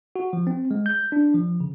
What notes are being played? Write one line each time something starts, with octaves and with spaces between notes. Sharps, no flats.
F#4
F3
C4
G#3
G6
D4
F3
C#3